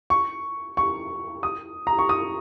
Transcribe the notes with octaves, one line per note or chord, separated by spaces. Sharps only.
C#6
C#6
D#6
A#5
C#6
D#6